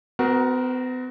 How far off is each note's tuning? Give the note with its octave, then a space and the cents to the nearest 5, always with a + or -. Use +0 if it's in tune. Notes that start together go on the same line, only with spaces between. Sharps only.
B3 +45 F#4 +5 A#4 +15